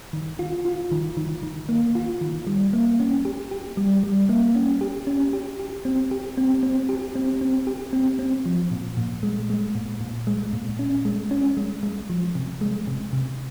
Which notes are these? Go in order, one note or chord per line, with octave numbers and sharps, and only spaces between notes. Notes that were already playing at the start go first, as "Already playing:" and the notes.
D#3
F4
F4
D#3
D#3
D#3
A#3
F4
D#3
G3
A#3
C#4
G4
G4
G3
G3
A#3
C#4
G4
C#4
G4
G4
C4
G4
C4
C4
G4
C4
C4
G4
C4
C4
F3
A#2
A#2
G#3
G#3
A#2
A#2
G#3
A#2
C#4
G#3
C#4
G#3
G#3
F3
C3
G#3
C3
C3